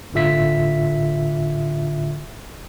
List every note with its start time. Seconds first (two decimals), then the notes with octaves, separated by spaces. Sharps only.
0.13 G1 A2 D3 F4 E5 B6